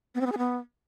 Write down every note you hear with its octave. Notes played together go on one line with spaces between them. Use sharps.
B3
C4
B3
G#4
B3